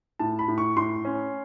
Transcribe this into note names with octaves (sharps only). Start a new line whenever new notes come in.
A2 A5
B5
A2
C#6
A2 C6
C#4